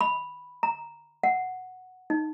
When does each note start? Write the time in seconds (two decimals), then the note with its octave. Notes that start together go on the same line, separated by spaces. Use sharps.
0.01 B5
0.63 A#5
1.23 F#5
2.10 D#4